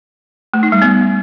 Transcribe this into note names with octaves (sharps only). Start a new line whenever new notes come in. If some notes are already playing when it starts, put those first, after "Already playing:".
A3
D#4
G3
B3